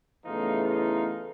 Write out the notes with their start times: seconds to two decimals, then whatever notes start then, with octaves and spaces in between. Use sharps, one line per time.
0.24 E2 C#3 E3 A3 D#4 F4
0.67 D#4 F4